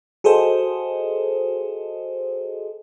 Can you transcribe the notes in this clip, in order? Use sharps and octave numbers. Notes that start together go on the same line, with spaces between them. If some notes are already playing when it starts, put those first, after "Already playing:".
F#4 G#4 A4 C5 D#5